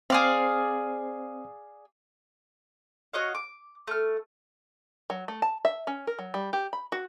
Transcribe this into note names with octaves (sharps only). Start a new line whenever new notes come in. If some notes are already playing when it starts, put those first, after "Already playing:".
C4 G#4 C5 D5 F5
F#4 C#5 D#5 F5
D6
A3 F6
F#3
A3
A5
E5
C#4
A#4
F#3
G3
G4
B5
F#4